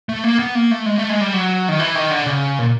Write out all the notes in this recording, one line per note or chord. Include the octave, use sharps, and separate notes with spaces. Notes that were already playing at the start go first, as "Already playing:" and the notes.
A3
A#3
B3
A#3
A3
G#3
A3
G#3
G3
F#3
D#3
E3
D#3
D3
C#3
A#2